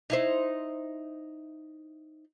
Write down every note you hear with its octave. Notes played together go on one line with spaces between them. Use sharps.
D#4 E4 C5